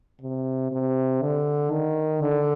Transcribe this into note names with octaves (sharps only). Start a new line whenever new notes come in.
C3
C3
D3
D#3
D3